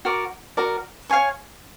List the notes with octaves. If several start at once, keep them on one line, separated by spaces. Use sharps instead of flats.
F#4 A#4 D5
F#4 A#4 D5
C#5 F5 G#5 C#6